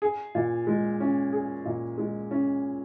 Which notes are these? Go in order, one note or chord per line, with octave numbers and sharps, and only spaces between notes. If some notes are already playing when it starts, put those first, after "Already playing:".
G#4
A#2
G#3
C#4
G#4
A#2
G#3
C#4